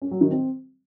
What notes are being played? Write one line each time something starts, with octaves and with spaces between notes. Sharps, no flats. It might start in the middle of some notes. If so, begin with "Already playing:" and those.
C#4
F#3
D#3
C4